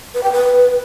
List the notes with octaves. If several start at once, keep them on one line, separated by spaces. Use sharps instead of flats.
B4
G5
B4